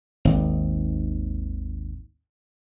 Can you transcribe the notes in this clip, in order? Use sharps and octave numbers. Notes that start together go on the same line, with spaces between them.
G#1 D#2